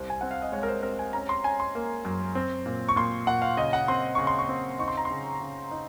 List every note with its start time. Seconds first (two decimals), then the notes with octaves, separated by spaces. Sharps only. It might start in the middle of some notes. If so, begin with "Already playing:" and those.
Already playing: C2 C5
0.10 G#5
0.21 C4 F#5
0.31 F5
0.42 D#5
0.52 G#3 C#5
0.63 A#4
0.68 C5
0.83 C4 A#4
0.99 G#5
1.13 C#4 A#5
1.29 C6
1.44 C#4 G#5
1.60 C6
1.75 A#3
2.05 F#2
2.35 C4
2.66 A#2
2.89 C#6
2.96 A#2 C6
3.27 A#2 F#5
3.42 F5
3.57 C#3 D#5
3.73 F#5
3.88 C4 C6
4.15 C#3 C#6
4.27 C6
4.38 C#6
4.49 C4
4.79 D#4 C#6
4.88 C6
4.97 A#5
5.05 C6
5.10 C#3
5.41 C#3
5.71 D#4